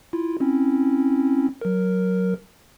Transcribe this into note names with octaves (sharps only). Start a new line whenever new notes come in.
E4 F4
C4 C#4 E4
F#3 A#4